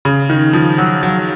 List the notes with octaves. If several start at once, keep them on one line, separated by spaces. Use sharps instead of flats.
C#3
D#3
F3
F#3
F#3